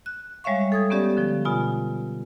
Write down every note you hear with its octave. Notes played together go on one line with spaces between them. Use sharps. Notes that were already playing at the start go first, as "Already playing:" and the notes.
F#6
G3 G#3 C#5 E5 F5 C#6
A4 D#6 G#6
B3 C#4 G4 D5
D3 F3
B2 F4 G#5 B5